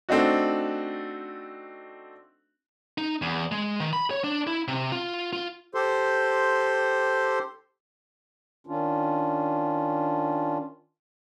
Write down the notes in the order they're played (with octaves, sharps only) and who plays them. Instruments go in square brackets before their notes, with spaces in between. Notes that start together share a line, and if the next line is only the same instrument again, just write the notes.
[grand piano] A3 C4 D4 D#4 F#4
[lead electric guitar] D#4
E2
G#3
D#3
B5
C#5
D4
E4
C3
F4
F4
[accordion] G4 A4 C5 C6
[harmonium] D#3 C#4 D4 F4